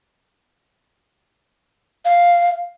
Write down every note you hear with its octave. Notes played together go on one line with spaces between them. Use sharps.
F5